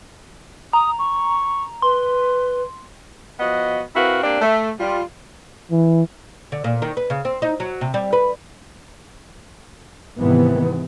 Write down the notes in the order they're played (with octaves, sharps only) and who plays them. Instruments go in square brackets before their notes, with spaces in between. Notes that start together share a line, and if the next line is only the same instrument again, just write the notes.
[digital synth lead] A#5 [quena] D#6
[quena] C#6
[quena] B4 [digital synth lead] C6
[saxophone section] F3 B3 F#4 D#5
C4 E4 F#4 A#4 B4 F5
A#3 C4 D4 G4 D5
A3
G3 F4
[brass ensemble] E3
[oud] D3
A#2
D#3
B4
C#3
C4
D#4
F#3
C3
G3
B4
[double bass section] G#2 C3 D#3 E3 B3